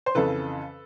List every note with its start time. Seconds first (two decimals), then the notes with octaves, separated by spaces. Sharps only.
0.06 C5
0.15 F2 C#3 E3 A4 B4